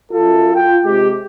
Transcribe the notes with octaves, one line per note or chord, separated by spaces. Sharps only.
F#2 F4 A4
F4 G5
C3 G#3 G4